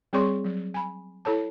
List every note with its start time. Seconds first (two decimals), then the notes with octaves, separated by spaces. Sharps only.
0.13 G3 C4 G#4 C#5 C6 C#6
0.44 F#3
0.74 G#5 B5
1.25 E4 A4 C#5 A5